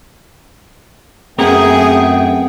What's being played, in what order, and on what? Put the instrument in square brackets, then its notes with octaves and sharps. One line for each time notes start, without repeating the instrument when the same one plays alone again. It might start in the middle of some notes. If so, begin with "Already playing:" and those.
[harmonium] F#2 A3 G5 [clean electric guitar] B3 C4 A#4 [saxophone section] G#4